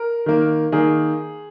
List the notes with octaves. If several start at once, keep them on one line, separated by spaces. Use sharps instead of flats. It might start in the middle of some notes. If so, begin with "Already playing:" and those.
Already playing: A#4
D#3 A#3
D#3 A#3 G#4